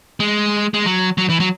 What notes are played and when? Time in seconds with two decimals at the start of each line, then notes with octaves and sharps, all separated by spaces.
0.20 G#3
0.74 G#3
0.86 F#3
1.18 F#3
1.29 E3
1.40 F#3